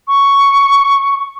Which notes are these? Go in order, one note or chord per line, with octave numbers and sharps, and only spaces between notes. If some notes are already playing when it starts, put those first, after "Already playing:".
C#6